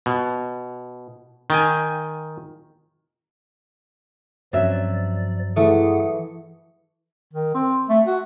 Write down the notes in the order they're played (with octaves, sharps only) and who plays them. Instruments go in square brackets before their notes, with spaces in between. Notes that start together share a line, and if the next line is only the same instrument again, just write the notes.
[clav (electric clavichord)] B2
D#3 G5 G#5
[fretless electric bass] G2 C4 C#4 [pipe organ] F3 D5 [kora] F#3 E5
[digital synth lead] E3 [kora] A3 [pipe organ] G#4 F#5
[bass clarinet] D#3
C4
A3
F#4